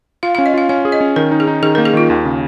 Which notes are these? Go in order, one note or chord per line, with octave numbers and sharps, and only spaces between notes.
F4 F5
F5
C#4
D#5
F4 F5
C#4 F5
G#4
D#5
C#4
D#3 A#4
D#4
G#4
D#4
D#3 G#4
A#4
A#3
G#4
D#3 F4
D#2
C#3